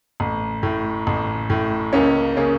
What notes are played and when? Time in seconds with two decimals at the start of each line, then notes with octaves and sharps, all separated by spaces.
0.20 A1
0.63 A2
1.07 A1
1.50 A2
1.93 C#2 A#3 C#4
2.37 C#3 A#3 C#4